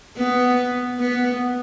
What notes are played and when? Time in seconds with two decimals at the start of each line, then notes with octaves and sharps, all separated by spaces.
0.17 B3
1.00 B3